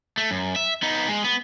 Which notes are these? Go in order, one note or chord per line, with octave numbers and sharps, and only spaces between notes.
A3
F#2
E5
B3 D#4
G#3
B3